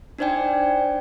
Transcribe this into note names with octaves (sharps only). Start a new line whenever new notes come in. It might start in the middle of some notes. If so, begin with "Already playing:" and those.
D4 D#4 C5 D5 G5 G#5